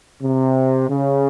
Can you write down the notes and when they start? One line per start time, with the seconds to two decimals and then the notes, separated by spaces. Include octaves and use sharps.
0.22 C3
0.88 C#3